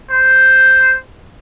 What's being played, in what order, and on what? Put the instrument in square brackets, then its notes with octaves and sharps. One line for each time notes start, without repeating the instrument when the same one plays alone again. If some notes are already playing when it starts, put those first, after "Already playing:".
[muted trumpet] C5